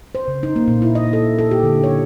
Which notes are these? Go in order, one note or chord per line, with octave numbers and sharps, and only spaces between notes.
C5
C#3
D#4
A#3
A#2
E4
D#5
A4
A4
G4
D3
C#5